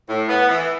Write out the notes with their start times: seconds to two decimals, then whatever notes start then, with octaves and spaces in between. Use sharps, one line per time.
0.09 A2
0.28 B3
0.49 E3